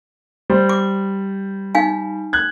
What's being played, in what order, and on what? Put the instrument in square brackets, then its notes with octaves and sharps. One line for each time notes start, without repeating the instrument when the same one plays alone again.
[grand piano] G3 C5
[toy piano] D6
D#4 F5 G#5
[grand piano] F#6 G#6